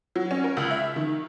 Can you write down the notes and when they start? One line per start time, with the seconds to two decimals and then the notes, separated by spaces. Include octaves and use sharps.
0.16 F#3
0.31 C#4
0.44 A#4
0.57 C#2
0.71 E5
0.96 D#3